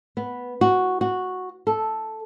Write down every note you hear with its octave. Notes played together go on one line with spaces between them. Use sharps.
B3
F#4
F#4
A4